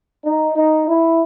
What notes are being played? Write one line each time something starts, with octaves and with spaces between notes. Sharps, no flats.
D#4
D#4
E4